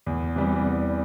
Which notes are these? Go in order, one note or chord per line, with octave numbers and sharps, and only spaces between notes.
E2
C3 E3 G3
E2